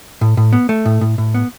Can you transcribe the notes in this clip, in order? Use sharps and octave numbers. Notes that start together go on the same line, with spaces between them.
A2
A2
B3
A3
A2
A2
A2
B3